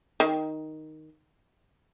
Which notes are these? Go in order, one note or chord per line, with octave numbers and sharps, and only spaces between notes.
D#3